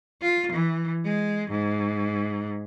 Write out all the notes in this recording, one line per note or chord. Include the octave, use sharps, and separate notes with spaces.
F4
E3
G#3
G#2